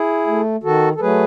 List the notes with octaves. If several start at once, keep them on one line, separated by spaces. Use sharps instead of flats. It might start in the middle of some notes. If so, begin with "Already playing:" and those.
Already playing: E4 G#4
A3
D#3 F#4 A4
A4
F#3 A3 G#4 B4